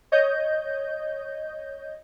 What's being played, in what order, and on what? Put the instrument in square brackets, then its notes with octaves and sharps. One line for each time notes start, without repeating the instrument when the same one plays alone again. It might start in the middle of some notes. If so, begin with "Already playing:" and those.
[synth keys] C#5 D#5 G6